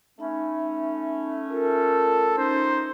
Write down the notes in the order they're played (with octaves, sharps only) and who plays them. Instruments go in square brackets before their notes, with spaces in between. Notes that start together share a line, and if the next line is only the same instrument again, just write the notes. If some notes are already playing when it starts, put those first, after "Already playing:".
[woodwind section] A3 C#4 [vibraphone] D#4 E5 B5
[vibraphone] F4 A#4 [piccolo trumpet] A4
[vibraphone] C#4 [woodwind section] D#4 [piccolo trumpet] C5